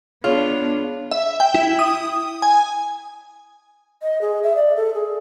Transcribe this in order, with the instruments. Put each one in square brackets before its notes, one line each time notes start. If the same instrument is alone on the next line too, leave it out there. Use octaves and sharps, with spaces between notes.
[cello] B3 D4 [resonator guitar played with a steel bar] F4 [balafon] G#4 [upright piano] C#5
[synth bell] E5
G5
E4
D#6
G#5
[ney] D#5
G#4
E5
D5
A4
G#4